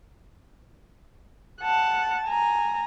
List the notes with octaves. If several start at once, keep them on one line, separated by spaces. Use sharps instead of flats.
F#5 A5
G#5 A#5